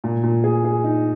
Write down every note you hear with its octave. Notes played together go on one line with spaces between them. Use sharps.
A#2
A#2
G#4
G#4
D#4